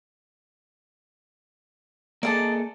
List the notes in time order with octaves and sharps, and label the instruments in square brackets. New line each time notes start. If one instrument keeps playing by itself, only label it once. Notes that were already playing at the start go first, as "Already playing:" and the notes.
[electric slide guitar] A#3 G#4 A4 [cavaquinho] D5 D#5 A5